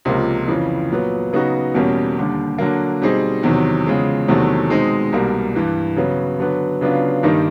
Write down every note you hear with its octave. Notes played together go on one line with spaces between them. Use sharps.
C#2 C3 F3 A#3
F2 C#3 E3
A#2 F#3 B3
C#3 F#3 B3 D#4 F#4
E2 B2 G3 A#3 C#4
D#2 D3 G3
D3 F#3 A#3
B2 G3 C4 D#4 G#4
E2 C3 D#3 F#3
E2 C#3 F3 G#3
E2 C3 D#3 F#3 A3
B2 G#3 C4 D#4
C2 B2 G3 A#3
G2 E3 G3
C#3 F#3 B3
D3 F#3 B3
C#3 F#3 B3 D4 F4
G2 D#3 G3 A#3 D#4